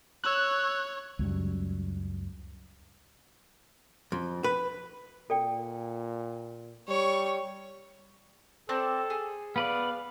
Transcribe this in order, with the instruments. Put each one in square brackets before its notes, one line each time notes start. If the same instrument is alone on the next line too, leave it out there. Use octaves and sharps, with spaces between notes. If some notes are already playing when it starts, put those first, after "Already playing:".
[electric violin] C#5 [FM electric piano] E6 F#6
[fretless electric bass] C#2 F#2 G3
[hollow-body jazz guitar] F2
B4
[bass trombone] A#2 [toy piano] A4 D5 G5
[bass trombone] G3 [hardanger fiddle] C#5 C#6
[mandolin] C4 D4 D5 [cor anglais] A4
[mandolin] G#4
[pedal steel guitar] B3 B4 D5 [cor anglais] F5